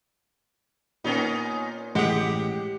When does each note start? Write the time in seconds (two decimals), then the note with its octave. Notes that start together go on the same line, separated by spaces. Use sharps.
1.04 A#2 B3 C#4 D#4
1.95 A1 G#3 G4 G#4 F#5 C#7